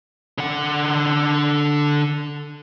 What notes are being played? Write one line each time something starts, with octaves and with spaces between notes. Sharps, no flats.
D3 F#5